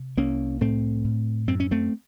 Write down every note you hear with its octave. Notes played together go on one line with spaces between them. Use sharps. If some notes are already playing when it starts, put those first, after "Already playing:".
Already playing: C3
C2 A#3 C#4
A2 A3 C4
A2
F#2 C4
C#4
A3 C4